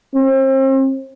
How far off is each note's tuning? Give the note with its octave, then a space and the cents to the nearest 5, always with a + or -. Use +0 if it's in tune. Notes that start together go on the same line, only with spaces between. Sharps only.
C4 +35